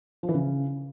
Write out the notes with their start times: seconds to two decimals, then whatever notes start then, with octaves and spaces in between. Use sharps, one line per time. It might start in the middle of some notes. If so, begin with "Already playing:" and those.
0.23 F3
0.29 E3
0.34 C#3